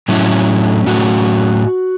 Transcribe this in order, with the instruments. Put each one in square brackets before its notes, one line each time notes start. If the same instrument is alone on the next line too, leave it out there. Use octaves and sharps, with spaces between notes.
[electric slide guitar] A2 F#3 A3 C#4 E4
A2 F#3 A3 C#4 F#4